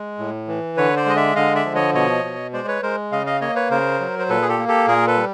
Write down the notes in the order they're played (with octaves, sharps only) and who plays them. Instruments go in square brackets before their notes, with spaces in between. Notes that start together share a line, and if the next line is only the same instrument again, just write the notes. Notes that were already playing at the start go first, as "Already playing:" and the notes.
Already playing: [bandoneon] G#3
A2
E3
D3 B4 C#5
C5 D5
G#3 D#5
D5 E5
D3 D#5 F5
D5 E5
F3
C#5 D#5
B2 C#5 D#5
B2
G#3 C5 D5
B4 C#5
G#3 A#4 C5
C#3 D#5 F5
D#5 F5
A#3 C#5 D#5
B4 C#5
C#3 A#4 C5
F#3
C5
A#2 A4 B4
G#4
G4 A4
A#3
G4 A4
A#2 G#4 A#4
A4 B4
G3